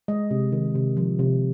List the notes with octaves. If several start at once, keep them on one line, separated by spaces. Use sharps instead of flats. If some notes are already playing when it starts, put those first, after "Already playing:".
G#3 D#5
C3
D#3
C3
F3
C3